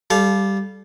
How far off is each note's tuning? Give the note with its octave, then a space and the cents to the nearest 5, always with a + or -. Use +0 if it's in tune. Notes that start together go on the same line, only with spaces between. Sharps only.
G3 +0 A4 -30 F5 +0